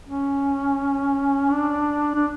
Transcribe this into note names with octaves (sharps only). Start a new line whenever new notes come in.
C#4
D4
D4